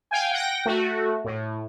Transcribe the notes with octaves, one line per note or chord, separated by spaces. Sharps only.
F5 G5 G#5
F#5 G5 A#6
A3 F#4
A2